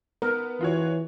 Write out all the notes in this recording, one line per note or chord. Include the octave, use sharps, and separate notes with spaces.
B3 A#4
E3 F4 F#4 C#5